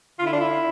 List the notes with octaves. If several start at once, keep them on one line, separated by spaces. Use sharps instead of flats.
D3 F4
E4
D4
E4